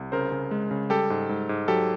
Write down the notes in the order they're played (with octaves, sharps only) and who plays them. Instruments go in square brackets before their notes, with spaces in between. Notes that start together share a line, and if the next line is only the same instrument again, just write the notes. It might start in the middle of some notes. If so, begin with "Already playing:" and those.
Already playing: [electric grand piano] C2
C#3 A#4 C5
C#3
G#3
C#3
G3 G4 A4
G#2
G#2
G#2
F#3 G4 A4